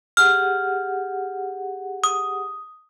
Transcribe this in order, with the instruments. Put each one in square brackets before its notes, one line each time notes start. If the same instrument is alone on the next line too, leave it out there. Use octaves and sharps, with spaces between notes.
[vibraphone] G4 G#4 F#5 [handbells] F6
[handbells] D#6